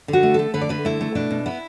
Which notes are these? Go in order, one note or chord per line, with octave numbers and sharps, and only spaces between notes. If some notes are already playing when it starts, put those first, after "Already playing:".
D3
F#4
A3
A3 A4
D3 B4
D5
D3 B4
A3 E4
A3
B2 D4
B2
B3 E4